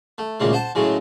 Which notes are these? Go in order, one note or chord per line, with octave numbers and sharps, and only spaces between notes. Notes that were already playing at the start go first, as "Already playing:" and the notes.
A3
D2 A#2 C#3 G#3
C5 F#5 A5
A2 C#3 F#3 G#3